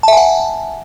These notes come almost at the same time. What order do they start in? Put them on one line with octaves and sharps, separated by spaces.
A5 E5 G#5 F#5